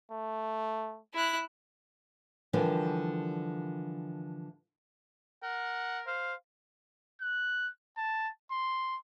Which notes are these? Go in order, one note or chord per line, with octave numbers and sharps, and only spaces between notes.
A3
E4 F#6
D3 E3 F3 G3 G4 A#4
A#4 F#5
C5 F5
F#6
A5
C6